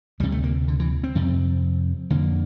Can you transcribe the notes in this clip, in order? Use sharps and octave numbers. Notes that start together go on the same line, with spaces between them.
D2 C3 G3
A3
A#3
D3
E3
C4
F2 C3
F2 D3 A#3